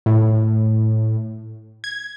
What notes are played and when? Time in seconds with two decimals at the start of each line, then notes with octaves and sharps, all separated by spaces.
0.06 A2
1.84 G#6